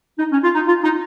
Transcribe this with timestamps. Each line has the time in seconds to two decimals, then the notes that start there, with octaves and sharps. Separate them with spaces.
0.19 D#4
0.32 C#4
0.43 F4
0.55 D#4
0.67 F4
0.83 D#4